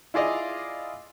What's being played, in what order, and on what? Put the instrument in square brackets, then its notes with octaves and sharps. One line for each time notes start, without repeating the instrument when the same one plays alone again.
[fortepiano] E4 F4 G#4 D5 D#5 F5